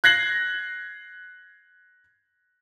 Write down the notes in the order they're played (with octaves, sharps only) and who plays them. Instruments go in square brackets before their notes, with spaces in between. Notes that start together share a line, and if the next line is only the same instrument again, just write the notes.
[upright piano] F#6 G#6 A#6 C7 F#7